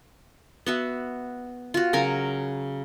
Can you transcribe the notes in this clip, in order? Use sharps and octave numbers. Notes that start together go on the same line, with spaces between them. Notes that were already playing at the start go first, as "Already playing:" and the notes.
B3 F#4 E5
F4 F#4
C#3 F#3 A#4 G#5